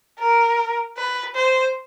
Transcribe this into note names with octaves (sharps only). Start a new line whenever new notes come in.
A#4
B4
C5